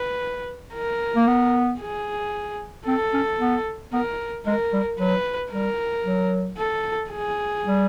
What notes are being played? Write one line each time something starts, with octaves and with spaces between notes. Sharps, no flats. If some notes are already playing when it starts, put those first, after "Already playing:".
Already playing: B4
A#4
A#3
B3
G#4
C4 A4
C#4
B3
B3 A#4
G#3 A#4
G3
F#3 B4
G3 A#4
F#3
A4
G#4
G3